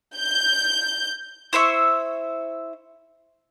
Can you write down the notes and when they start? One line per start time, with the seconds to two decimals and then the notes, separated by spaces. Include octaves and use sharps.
0.16 G6
1.53 E4 C5 E5 C#6